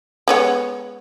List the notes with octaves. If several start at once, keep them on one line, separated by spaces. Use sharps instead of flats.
G#3 B3 C#5